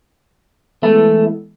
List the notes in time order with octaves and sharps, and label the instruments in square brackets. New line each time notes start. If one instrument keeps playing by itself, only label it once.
[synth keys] E3 G#3 B3 E4 A4 [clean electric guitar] A3